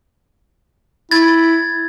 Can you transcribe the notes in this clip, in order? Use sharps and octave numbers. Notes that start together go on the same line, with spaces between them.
E4 G#6 A6